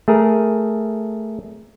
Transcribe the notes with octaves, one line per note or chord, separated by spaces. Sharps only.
A3 G#4 A#4